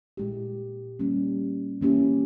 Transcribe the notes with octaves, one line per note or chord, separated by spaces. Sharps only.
A#2 G#3 E4 G4
G3 A#3 C#4
E3 A#3 C#4 E4 G4